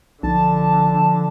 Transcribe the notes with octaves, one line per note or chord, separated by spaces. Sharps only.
B1 D3 F3 A5